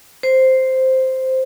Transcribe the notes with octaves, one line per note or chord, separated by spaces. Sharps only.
C5